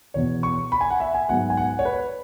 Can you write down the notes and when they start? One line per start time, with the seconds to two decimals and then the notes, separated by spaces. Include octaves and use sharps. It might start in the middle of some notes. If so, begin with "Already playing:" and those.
0.14 E2 B2 B3 C#5
0.43 C#6
0.72 B5
0.81 G#5
0.90 F#5
1.00 E5
1.15 G#5
1.29 G#2 F#3 B3 F#5
1.50 G#5
1.57 F#5
1.79 C#5
1.85 B4